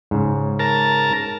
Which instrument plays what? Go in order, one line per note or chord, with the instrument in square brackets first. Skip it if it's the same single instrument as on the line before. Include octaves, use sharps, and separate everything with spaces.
[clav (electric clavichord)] G#2 C#3
[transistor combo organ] A#4 A5